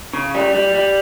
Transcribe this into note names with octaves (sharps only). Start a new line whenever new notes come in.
C#3
G3
G3
G3